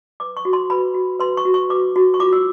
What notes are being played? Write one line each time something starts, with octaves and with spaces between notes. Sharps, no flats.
B4 D6
C#6
F#4
C6
B4 B5
F#4
B4 C6
C#6
F#4
C#6
B4 D6
F#4
C#6
F4 D6
E6